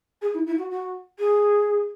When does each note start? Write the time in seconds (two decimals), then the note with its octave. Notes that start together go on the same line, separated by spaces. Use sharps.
0.21 G#4
0.34 E4
0.46 E4
0.58 F#4
0.71 F#4
1.19 G#4